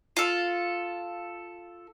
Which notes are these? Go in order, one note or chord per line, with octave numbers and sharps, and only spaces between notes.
F4 A4